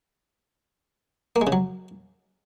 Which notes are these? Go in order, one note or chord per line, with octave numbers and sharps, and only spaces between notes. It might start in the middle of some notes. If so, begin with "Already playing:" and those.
A#3
G#3
C#3
F#3